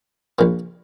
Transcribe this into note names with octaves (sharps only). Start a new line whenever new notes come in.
A#1 A#2 F3